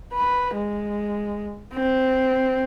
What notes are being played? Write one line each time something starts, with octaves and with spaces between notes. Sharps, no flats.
B4
G#3
C4